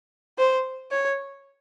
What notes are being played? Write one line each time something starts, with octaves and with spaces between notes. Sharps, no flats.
C5
C#5